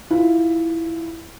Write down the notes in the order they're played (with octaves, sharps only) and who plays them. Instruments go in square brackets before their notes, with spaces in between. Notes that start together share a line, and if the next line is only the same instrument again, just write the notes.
[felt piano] E4 F4